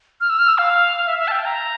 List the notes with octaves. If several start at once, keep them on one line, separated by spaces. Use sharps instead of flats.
F6
E6
F6
E6
F5
E5
E5
A5
G5
A#5